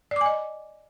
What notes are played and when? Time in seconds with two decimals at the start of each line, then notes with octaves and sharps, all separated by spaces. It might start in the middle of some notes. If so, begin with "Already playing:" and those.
0.11 D5
0.16 D6
0.21 G#5
0.26 D#5